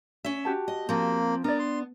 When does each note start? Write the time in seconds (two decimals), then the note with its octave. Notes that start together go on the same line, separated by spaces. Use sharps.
0.25 C#4 E5
0.45 F#4 G4 A5
0.68 D#5
0.89 F3 A#3 C4
1.44 B3 D4 A#4 D5
1.59 C6